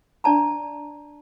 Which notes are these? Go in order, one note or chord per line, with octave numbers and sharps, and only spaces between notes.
D4 D5 A5 A#5